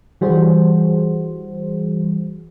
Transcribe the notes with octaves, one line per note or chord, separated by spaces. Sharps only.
E3 G3 F#4 G#4 C5